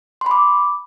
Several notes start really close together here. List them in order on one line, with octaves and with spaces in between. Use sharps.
C6 B5 D6